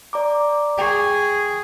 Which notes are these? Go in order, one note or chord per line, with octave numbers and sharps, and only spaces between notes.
D5 A#5 D6
G#4 G5 C#6